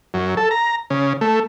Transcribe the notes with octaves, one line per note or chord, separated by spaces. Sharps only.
F#2
A4
A#5
C#3
A3